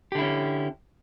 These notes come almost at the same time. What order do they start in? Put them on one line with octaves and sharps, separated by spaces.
G4 D3 E4 C#4